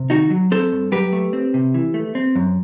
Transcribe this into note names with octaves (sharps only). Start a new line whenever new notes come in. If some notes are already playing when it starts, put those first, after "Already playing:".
Already playing: C3
D#3 D#4 F#4
F#3
C4 A4 C5
G2
F#3 G4 B4
A3
C4
C3
E3
A3
C4
F#2